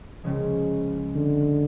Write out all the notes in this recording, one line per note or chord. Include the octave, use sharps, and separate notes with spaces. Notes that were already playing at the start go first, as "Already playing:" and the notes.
C#2 C#3 F3 G#3
D3